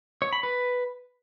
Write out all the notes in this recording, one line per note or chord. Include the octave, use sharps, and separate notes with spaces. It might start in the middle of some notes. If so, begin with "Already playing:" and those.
C#5
B5
B4